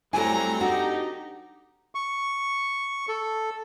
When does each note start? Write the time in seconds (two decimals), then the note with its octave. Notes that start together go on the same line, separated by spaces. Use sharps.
0.13 F#3 G3 A3 C4 E4 A4 G#5 A#5
0.61 D4 D#4 F#4 G4
1.95 C#6
3.09 A4